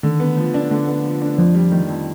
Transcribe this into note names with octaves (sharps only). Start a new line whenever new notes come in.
D3 D#3
B3
F3
D4
D3
B3
F3
D4
F2 F3
G3
D#3
F2